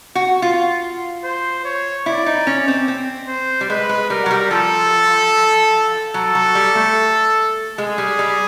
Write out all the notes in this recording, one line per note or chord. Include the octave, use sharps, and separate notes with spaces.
F#4
F4
C5
C#5
E4 D5
D#4
C#4
C4
C4
C5
G3
G#3 B4
G#3
G3 A#4
F#3
G3
F3 A4
F#3 A4
F#3
G3
A3
G#3 G#4
G3
G3